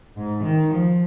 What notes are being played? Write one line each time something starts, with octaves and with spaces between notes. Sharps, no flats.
G#2
D#3
F3